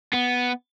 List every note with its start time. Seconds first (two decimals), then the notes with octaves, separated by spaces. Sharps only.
0.14 B3